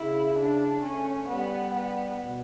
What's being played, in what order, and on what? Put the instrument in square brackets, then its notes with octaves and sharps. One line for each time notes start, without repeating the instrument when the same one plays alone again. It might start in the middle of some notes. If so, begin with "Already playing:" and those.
Already playing: [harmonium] C#3 [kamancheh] E4
[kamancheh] D4
[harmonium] A3 [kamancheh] C#4
[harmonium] G3 [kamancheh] B3
[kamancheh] B3
[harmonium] A2
B2